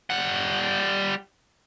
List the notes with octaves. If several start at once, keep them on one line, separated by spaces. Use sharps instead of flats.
G3 F#5